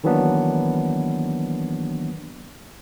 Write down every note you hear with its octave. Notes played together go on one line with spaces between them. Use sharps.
D#3 E3 F#3 A#3 B3 D4